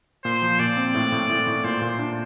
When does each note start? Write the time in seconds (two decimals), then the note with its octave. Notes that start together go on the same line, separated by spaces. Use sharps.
0.24 A#2 C5
0.42 F3
0.59 A#2 D5
0.77 C4
0.94 A2
1.12 A2
1.29 A2
1.47 A2
1.64 A#2 C5
1.82 A#2
1.99 D4